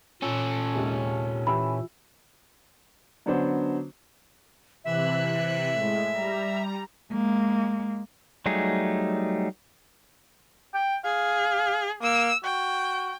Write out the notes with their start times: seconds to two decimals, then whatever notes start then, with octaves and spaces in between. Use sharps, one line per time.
0.22 A#2 C#4 A4
0.75 D#2 C3 G#3
1.47 E3 G4 B5 E6
3.26 D3 F#3 B3 C#4 D4 C5
4.85 C3 E3 E5 F#6
5.72 A2 G#3
6.12 G3 A#5
7.12 G#3 A#3
8.46 F#3 G3 A3 D#4 G#4
10.74 G5
11.05 G#4 F5
12.02 A#3 E6
12.44 F#4 G5